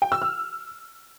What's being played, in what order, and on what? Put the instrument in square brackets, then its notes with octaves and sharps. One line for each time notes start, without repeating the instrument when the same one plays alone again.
[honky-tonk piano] G5
E6
F6